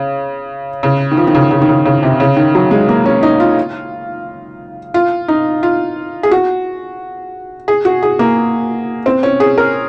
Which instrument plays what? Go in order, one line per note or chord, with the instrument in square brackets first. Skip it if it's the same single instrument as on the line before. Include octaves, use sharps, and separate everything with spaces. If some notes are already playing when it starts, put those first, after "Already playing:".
Already playing: [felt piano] C#3
C#3
D#3
F3
D#3
C#3
C#3
D#3
C#3
C#3
C3
C#3
D#3
F#3
G#3
A#3
C#4
D#4
F4
F4
D#4
F4
G#4
F#4
G#4
F#4
G#4
A#3
C4
C#4
G#4
A#4